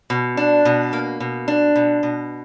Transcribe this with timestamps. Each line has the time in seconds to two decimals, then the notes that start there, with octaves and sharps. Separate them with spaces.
0.10 B2
0.37 D4
0.65 B2
0.93 A#3
1.20 B2
1.48 D4
1.75 B2
2.03 B2